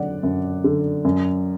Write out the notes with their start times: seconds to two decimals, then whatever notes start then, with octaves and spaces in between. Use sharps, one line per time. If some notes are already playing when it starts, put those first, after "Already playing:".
Already playing: F#2 D3 D5 F#5
0.23 F#2
0.64 D3
1.05 F#2